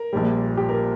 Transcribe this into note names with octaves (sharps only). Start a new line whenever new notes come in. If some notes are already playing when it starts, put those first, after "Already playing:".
Already playing: A#4
A#1 A#2 G3
G4
A#4